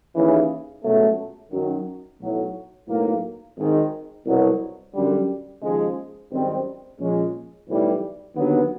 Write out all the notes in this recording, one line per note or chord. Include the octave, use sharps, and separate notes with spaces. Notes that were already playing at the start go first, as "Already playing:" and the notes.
D#2 C#3 E3
C#2 B2 F#3 A3
F#2 D#3 F#3
B1 A2 F#3
B1 A2 F#3 A#3
G#1 G#2 D#3
C2 B2 F#3
F#2 D3 G3
D#2 C#3 F3 G#3
G#1 F#2 D#3 G3 C4
A#2 F3 G#3 C#4
B1 A2 E3 G3
D#2 D3 F#3 B3